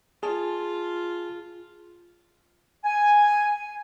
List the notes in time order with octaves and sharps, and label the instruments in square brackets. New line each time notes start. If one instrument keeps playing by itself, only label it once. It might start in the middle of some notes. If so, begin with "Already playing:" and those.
[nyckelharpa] F4 [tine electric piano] G#4 A5
[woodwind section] G#5